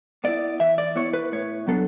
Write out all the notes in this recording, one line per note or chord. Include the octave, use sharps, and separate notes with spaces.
B3 E4 D5
E3 E5
D5
B3 E4 C#5
B4
A2 C#5
F#3 B3 D4 A4